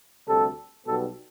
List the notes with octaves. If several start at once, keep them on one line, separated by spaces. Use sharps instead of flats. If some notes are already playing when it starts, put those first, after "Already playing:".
D2 C3 G3 A4
B1 B2 G3 B3 A4